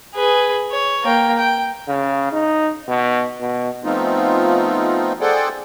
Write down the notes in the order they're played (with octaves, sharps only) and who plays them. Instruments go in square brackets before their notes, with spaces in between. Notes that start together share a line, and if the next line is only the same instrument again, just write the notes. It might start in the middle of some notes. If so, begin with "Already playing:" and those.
[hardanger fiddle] G#4 B4
C#5
A#3 G5
G5
[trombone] C#3
D#4
B2
B2
[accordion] F3 A3 B3 C4 D#4 F4
G#4 A4 C5 D5 F#5 G5